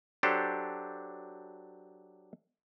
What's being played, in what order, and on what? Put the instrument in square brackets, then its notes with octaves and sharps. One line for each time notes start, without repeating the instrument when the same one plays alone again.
[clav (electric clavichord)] F#3 D4 G4 A4 C5